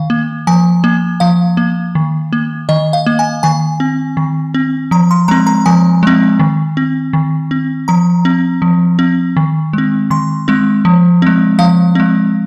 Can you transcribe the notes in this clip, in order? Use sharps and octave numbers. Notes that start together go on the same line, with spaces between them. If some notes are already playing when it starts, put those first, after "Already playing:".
Already playing: D#3 F5
A#3
F3 G#5
A#3
F3 F5
A#3
D#3
A#3
D#3 D#5
F5
A#3
G#5
D#3 G#5
C4
D#3
C4
F3 A#5
C6
G#3 C4 A#5
A#5
F3 G#5
G#3 C4
D#3
C4
D#3
C4
F3 A#5
C4
F3
C4
D#3
G#3 C4
D#3 C6
G#3 C4
F3
G#3 C4
F3 F5
G#3 C4